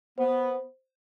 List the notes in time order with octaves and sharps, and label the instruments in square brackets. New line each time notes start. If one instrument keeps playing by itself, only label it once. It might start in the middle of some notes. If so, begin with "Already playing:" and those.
[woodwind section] B3 [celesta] C5